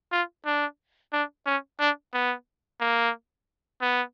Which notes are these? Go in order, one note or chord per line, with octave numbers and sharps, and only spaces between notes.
F4
D4
D4
C#4
D4
B3
A#3
B3